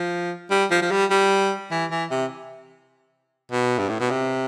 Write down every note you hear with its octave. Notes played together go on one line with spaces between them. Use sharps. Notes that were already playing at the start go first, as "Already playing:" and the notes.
Already playing: F3
G3
F3
F3
G3
G3
E3
E3
C3
B2
G2
A2
B2
C3